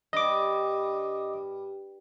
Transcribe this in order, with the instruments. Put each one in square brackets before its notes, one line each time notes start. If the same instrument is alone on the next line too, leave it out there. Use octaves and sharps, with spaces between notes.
[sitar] G2 [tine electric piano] D#5 D6